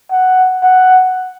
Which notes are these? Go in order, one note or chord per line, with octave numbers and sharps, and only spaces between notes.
F#5
F#5